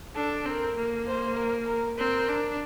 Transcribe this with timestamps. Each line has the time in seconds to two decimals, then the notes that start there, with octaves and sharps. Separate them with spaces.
0.16 D4 A4
0.46 C4 A#4
0.77 A#3
1.07 C5
1.37 A#4
1.67 A#4
1.98 C4 A#4
2.29 D4